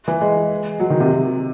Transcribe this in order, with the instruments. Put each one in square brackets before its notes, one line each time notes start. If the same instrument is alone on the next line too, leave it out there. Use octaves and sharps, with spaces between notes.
[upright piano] E3
G#3
F#3
D#3
C3